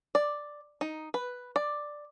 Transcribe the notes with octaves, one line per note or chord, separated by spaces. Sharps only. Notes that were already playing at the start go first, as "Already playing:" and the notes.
D5
D#4
B4
D5